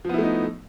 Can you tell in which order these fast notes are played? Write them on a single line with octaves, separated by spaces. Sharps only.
F3 B3 E4 A3 D#4